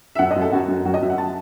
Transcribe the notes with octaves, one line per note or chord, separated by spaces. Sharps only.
E5
F#2 F#5
D#5
F#2
A4
F#2 F#4
F#2
F#2 F#4
D#5
F#2 E5
F#5
A5